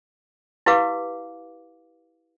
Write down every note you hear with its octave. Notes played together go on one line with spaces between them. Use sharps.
E4 G4 B4 F5 D6